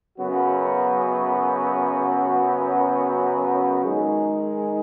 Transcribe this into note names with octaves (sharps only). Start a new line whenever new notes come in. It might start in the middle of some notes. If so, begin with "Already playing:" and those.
F#2 C#3 F#3 B3 F#4
D#3 G#3 D#4 G#4